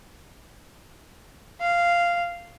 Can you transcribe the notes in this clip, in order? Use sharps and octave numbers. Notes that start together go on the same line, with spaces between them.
F5